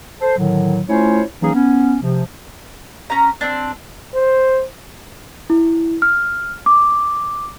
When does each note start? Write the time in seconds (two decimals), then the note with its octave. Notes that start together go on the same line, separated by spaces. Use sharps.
0.21 A4 C5
0.37 A2 D3 D#3 F#3
0.88 A3 C#4 E4 F4 C5 C#5
1.41 E3 F#3 A#3 C#4 D#4 G#4
1.54 B3 C#4
2.02 C3 F3
3.10 C#4 A#5
3.41 C4 D4
4.15 C5
5.50 E4
6.02 F6
6.66 D6